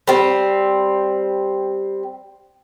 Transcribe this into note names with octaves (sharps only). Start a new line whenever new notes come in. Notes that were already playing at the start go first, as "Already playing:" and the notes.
G3 C4